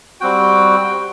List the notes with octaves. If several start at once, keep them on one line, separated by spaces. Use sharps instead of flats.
G3 C4 F#4 G5